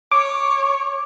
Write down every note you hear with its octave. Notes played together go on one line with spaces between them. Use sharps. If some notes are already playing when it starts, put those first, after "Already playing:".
C#5 D6